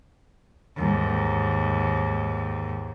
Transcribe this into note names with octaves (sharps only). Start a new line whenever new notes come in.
D#2 G#2